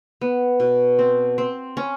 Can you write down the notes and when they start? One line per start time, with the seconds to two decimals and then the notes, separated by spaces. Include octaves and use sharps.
0.21 B3
0.60 B2
0.99 C4
1.38 C4
1.77 C#4